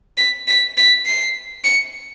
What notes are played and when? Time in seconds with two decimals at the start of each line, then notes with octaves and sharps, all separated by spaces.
0.17 B6
0.48 B6
0.77 B6
1.06 C7
1.64 C#7